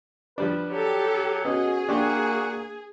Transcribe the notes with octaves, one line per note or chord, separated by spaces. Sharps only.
F3 G3 D4 B4
F#3 G4 A4
B3 C#4 F#4 G#4 D#5
A#3 D4 F#4 G4 C6